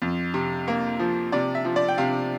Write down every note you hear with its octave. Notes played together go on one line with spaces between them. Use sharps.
F2
C3
A#3
F3
C3 D5
E5
F3
D5
G5
C3 F5